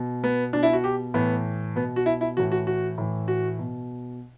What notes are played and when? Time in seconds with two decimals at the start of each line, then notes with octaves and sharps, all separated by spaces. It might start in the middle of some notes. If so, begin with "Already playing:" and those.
Already playing: B2
0.24 B3
0.53 B2 D4
0.63 E4
0.73 F#4
0.84 G4
1.14 A2 E3 B3
1.76 B2 B3
1.96 F#4
2.06 E4
2.21 E4
2.37 A2 E3 F#4
2.52 F#4
2.67 F#4
2.98 A2 E3
3.28 F#4
3.59 B2